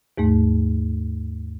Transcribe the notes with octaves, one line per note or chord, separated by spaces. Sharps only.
D#2 G#2 A3